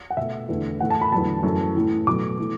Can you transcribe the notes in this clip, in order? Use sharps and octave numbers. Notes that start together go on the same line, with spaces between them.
F#5
B2 E5
A3
E2 D3 A3
A2 E3 A3 F#5
A5
B5
E2 D3 F#3 A3 A5
F#2 E3 A3
A2 E3 A3
B2 F#3 A3 D6
E3 A3